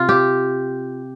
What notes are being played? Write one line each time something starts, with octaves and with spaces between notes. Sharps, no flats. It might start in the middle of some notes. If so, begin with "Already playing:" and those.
Already playing: C3 F4
G4